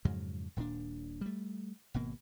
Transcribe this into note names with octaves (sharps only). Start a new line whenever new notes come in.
F2 G#2 C#3 F#3
D#1 A#2 A#3 D4
G3 A3
G#1 B2 A#3